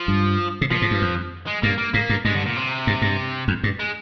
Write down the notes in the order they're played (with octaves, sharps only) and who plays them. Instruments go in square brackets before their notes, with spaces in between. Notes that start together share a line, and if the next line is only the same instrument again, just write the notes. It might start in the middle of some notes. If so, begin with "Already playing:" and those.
Already playing: [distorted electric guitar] F3
[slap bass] G2
C3
[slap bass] A#2 [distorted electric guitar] F3
[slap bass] G#2
G2
F2
[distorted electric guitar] G#3
[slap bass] G2 [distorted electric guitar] A#3
[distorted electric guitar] A#3
[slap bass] G#2 [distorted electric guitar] A#3
[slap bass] G2
[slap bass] G2 [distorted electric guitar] G#3
[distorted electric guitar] D3
A#2
C3
[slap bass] G2
G2
F2
G2
[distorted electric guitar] G#3